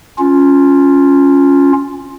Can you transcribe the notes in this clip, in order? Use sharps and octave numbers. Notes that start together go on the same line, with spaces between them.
C#4 F4